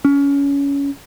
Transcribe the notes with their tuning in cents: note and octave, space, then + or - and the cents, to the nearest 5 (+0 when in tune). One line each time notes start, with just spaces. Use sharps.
C#4 +20